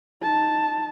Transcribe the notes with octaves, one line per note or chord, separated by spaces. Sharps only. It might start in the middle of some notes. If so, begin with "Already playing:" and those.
D#4 A5